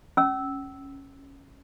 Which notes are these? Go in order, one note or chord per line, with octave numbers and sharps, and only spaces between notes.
C#4 E6